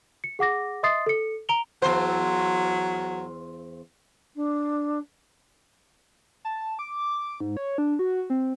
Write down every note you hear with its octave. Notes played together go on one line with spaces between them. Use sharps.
C#7
G#4 F#5 D6 A#6
D#5 E5 C6 D#6 A6 C7
A4 C#7
A#5 D7 F7 G7
E2 F#3 C5
D4
A5
D6
G#2
C#5
D4
F#4
C4